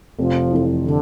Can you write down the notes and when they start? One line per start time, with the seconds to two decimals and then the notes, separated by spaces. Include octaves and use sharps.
0.19 F1 F3
0.51 F2 E3
0.84 D3